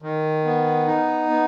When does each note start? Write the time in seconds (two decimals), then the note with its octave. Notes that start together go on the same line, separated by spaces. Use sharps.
0.02 D#3
0.45 B3
0.87 D#4
1.30 B3